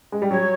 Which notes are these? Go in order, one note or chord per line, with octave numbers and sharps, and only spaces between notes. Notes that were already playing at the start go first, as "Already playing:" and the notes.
G#3
G3
F#3 C#5